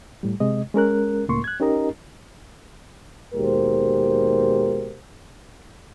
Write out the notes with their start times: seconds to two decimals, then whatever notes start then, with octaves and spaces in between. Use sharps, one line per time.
0.23 A2 G3
0.40 C3 G#3 D#5
0.74 G#3 C#4 A#4 F#6
1.29 C#2 A2 A#3 C6 C#6
1.44 F#6 G#6
1.60 C#4 D#4 G4 A#4 D#5 A#5
3.35 D#2 B2 G#3 G4 A#4 C5